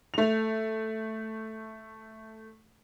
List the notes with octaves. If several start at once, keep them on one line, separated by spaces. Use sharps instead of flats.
A3 F7